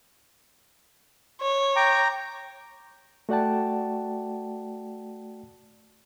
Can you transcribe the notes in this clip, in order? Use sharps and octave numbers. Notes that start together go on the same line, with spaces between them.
C#5
G5 A#5 D6
A3 F#4 D5 F#5 G5 A5